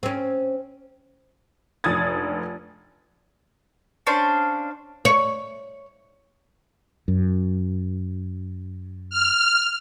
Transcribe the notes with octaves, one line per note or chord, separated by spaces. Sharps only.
C4 C#4
F1 A#1 D#6 G#6 A6
C#4 D4 C5 F5
C#5
F#2
F6